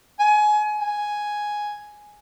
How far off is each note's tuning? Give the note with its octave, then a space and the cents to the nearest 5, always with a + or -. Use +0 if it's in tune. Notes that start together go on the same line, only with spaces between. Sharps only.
G#5 +25
G#5 +5